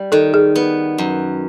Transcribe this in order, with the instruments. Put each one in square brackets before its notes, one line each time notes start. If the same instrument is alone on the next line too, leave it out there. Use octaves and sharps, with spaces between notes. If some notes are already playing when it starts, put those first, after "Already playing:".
Already playing: [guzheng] G3
[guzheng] D#3 [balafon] A4
[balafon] G#4
[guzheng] B3
F#2